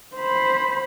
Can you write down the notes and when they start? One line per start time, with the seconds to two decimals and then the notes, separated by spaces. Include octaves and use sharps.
0.16 C5 B5